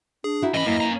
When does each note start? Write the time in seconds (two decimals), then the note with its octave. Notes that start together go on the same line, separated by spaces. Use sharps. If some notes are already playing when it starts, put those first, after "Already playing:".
0.24 D4 G#4
0.42 D#4 E4 F#4
0.54 A2 E3 C#4 D#5 B5
0.66 F#2 A#3 E4
0.80 C#4 A#5